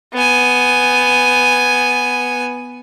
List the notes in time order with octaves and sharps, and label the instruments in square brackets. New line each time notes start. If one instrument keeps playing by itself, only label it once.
[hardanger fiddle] B3 G#5